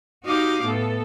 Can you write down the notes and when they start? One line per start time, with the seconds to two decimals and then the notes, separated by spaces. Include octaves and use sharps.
0.25 D#4 F#4 G4 F5 D6
0.63 A2 B3 A4